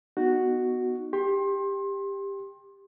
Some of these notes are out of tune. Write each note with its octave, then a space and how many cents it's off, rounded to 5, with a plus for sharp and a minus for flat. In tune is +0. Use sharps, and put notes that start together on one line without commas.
B3 +5 D#4 -10 F#4 +0
G4 +15 C6 +30